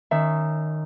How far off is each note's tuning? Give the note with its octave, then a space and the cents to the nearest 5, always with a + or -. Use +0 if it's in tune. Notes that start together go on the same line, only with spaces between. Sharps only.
D#3 -10 C#4 +0 E5 +10